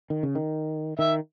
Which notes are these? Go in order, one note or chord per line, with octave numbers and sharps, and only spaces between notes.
D#3
C#3
D#3
D#3 E5